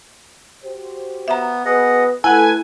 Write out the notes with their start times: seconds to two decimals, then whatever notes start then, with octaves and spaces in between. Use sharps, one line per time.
0.63 F#4 G4 C5
1.28 B3 E5 A#5
1.65 B3 F#4 G#4 B4 D#5 F#5
2.24 A3 E4 A4 B4 F#5 G#5